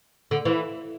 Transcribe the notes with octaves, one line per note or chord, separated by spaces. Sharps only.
D3
E3